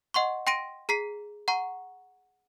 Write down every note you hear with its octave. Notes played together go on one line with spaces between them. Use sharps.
D#5 F#5 C6 C#6
G5 C6 A#6 D7 D#7
G#4 A#5 B6 C7
F#5 A#5 C#6